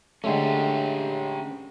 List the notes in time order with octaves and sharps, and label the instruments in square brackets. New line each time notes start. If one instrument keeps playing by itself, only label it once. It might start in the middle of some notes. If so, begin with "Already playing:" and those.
[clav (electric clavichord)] D3 G#3 A3 [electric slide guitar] C#4 G4